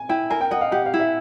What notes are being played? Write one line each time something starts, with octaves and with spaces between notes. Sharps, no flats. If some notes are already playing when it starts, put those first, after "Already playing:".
Already playing: G#5
E4 G5
A#4 G#5
G5
D#5 F#5
F5
G4 F#5
F5
E4
E5